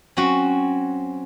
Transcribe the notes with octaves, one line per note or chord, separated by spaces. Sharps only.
F#3 C4 C#4 F#4